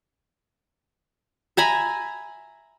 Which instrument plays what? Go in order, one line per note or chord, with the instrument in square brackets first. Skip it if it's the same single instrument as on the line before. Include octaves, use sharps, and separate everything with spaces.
[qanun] E5 G#5 A#5 B5